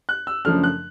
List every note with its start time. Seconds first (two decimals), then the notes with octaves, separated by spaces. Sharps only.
0.09 F#6
0.27 E6
0.45 F#2 C#3 F3 A3 D4 F6
0.64 F#6